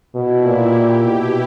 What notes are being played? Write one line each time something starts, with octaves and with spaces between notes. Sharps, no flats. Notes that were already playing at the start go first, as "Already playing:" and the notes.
B2 E4
A#2 G4
G4
B2 E4